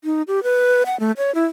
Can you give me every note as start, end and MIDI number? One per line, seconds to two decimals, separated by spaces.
0.04 0.22 63
0.28 0.43 67
0.43 0.83 71
0.86 0.98 78
1.00 1.12 57
1.17 1.34 73
1.35 1.44 64